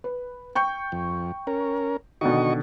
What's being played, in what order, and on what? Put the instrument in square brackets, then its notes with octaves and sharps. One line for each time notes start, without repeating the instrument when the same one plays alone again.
[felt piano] B4
G5 C#6 G6
[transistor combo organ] F2
C#4 A#4
[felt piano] B2 D3 D#3 [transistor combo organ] F#4 D#5 C#6